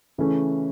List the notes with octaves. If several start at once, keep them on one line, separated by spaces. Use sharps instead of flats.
C#3 E3 A3 C#4